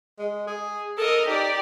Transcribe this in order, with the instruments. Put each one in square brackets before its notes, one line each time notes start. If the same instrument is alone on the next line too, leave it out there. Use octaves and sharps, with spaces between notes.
[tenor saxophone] G#3
G#4
[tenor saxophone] A4 [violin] A#4 D#5
[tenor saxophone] D#4 [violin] G4 D5